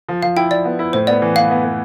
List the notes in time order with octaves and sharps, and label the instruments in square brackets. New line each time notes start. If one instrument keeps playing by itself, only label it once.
[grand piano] F3
[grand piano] F3 [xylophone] F5
[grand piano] E4 [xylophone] G5
[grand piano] F3 [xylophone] D5
[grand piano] B3
E4
[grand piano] A2 [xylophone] C5
[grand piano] B3 [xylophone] D5
[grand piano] E3
[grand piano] B3 [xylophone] F5
[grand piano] B3
B3